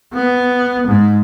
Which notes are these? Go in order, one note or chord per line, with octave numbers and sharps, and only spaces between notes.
B3
G#2